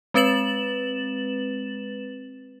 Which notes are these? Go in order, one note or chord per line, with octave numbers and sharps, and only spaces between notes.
G#3 C4 B4 A6 E7 F#7